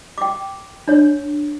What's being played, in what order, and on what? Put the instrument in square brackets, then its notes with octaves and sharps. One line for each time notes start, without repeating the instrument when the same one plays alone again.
[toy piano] G5 D6
D4 C#5